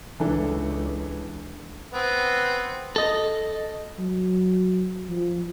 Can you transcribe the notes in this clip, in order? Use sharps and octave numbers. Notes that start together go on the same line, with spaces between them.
C#2 E3 D4 A4
B3 C4
A4 D#5
F#3
F3